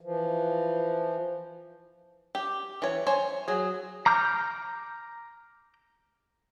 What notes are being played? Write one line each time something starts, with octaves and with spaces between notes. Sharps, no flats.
E3 F3
G4
E3 C#5
C5 C#5 G#5
F#3 G#4
A#5 D6 F6 G6